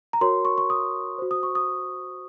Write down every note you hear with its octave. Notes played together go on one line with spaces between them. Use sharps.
A#5
F#4 A#4 C#5 C6
C#6
C#6
D#6
F#4 C5
D#6
C#6
D#6